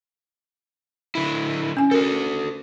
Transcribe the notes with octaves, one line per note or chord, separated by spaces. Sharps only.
D3 E4
C#4 G#5
F#4 A4 A#4